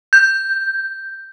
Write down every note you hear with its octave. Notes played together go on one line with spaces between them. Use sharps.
G6